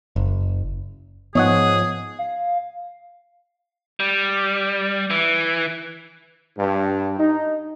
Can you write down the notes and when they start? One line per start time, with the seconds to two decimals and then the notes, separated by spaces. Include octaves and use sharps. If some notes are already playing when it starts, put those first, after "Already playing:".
0.16 F#1
1.35 G#2 F3 B3 G#4 C#5 D#5 F#5
2.19 F5
4.00 G3
5.10 E3
6.57 G2
7.19 D#4